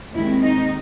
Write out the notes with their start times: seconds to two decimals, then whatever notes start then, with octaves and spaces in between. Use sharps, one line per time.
0.13 D#2 D#3 G#3 C4 E4
0.42 D#4